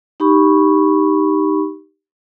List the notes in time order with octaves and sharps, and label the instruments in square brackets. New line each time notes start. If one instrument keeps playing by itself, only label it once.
[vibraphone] D#4 G4 B5 C#6